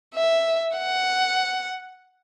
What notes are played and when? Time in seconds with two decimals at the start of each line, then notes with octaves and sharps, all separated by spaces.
0.15 E5
0.78 F#5